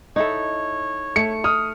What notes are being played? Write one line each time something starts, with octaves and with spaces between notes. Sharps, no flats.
D#4 E4 A4 C#5
A3 C#7
D#6 F6